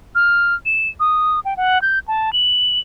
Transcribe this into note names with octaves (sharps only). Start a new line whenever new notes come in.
F6
E7
D#6
G5
F#5
G6
A5
F#7